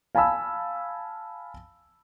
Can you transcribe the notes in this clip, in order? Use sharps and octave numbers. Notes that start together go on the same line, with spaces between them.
F5 G#5 A5 B5 E6